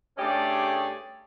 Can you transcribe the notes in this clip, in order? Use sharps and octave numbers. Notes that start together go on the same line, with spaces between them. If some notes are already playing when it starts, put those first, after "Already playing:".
G2 A3 C#4 G4 G#4 D5